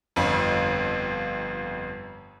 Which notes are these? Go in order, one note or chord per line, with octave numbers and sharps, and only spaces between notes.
G1 F2